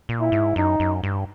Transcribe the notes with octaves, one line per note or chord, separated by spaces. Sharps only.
A#2
E4
G#2
F#2 D#4
F#2
G2